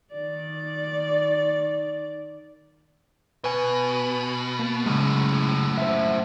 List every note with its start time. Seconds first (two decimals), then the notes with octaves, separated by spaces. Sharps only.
0.13 D#3 D5
3.44 B2 B4 G#5
4.59 A#3
4.86 F#2 A2 C#3 G#3
5.78 C5 E5